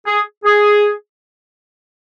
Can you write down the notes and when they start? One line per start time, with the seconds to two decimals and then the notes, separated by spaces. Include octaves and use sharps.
0.07 G#4
0.45 G#4